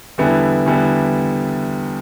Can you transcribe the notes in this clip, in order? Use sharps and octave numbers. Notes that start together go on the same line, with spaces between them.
E2 D3 G3 B3 E4
E2 D3 G3 B3 E4